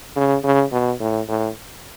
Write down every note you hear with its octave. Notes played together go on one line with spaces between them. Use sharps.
C#3
C#3
B2
A2
A2